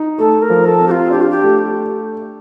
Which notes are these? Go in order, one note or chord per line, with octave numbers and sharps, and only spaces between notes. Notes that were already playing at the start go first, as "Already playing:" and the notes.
Already playing: D#4
A3 A4
A#4
F3
A4
C4
G4
F4
D4 G4
F4
G4
A3